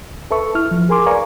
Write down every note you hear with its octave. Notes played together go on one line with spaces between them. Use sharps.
C#2
A4 B4 E5 A5 C#6
E4 F6
F3
G#4 A#4 G#5 C6 D6
B4 D5 F5 G#5 A#5 C#6